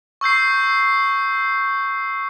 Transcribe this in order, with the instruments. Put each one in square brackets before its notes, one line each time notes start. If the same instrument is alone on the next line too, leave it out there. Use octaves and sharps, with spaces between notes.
[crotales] C#6 E6 G6 C7